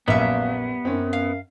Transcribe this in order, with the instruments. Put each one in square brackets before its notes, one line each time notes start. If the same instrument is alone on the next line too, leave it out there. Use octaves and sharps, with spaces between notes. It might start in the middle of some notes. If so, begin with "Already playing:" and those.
[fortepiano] A#1 F#2 [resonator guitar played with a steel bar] G3 E5 [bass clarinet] A#3 [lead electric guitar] B3
[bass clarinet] F#2 [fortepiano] C4 C#4
[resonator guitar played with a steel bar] F5